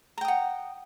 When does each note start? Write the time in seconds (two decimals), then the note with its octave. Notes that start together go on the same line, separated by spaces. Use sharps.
0.18 A#5
0.21 G5
0.25 D#6
0.28 F#5